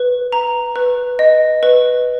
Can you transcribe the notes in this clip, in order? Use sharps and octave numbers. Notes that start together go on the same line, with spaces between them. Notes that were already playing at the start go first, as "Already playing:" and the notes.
Already playing: B4
A#5
B4
D#5
B4